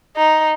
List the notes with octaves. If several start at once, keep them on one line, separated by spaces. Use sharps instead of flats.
D#4